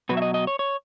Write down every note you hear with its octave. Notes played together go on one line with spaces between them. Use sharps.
B2 F#3 B4
E5
D#5
D#5
C#5
C#5